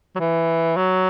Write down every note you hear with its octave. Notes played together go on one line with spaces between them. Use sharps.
F#3
E3
F#3